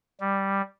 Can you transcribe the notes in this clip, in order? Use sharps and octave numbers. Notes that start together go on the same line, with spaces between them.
G3